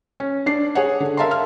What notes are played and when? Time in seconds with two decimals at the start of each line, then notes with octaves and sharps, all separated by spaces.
0.20 C#4
0.46 D4 C7
0.75 G#4 C#5 F#5
1.00 D3
1.17 A#4 E5 F5 A5 A#5 C6
1.31 F6